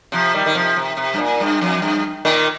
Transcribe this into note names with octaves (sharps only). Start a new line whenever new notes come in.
C3 F3
D#3 G3
D#3
C3 F3
C3
C3
G2
A#2
G2
F2
G2
A#2 D#3